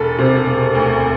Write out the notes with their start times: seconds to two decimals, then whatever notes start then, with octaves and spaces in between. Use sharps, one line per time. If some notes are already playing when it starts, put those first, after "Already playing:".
Already playing: E1 A4
0.18 C3
0.46 E1
0.75 D2